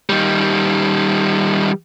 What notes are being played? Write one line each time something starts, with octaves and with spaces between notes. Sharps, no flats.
D#3 G3